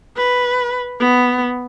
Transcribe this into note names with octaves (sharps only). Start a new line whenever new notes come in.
B4
B3